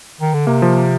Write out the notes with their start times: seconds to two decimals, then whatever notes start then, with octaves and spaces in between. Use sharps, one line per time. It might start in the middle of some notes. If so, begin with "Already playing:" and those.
0.21 D#3
0.34 D3
0.47 C3 A#3
0.62 F3